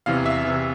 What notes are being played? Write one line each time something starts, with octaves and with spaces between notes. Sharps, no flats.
E2 C3 E3 F5
E5
C3 E3